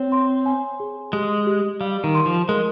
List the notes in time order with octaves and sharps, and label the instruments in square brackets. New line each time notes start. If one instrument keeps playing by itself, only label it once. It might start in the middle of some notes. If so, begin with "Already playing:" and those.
Already playing: [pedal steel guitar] C4 [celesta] C#5
[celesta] C6
G#5
G#4
[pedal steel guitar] G#3 [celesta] G4
[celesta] G4
[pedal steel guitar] G3 [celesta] F5
[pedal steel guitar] D#3
[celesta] C6
[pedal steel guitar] F3
[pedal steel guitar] G#3 [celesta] A#4